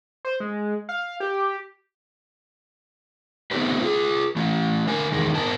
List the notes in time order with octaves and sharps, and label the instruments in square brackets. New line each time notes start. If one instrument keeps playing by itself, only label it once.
[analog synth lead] C5
G#3
F5
G4
[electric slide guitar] A3 B3 C4 D#4 G4 B4
F4 G#4
E3 A3 E4
D3 A#4 G#5
E2 D#3 G#3
G#2 B3 A#4 D#5 G#5 A5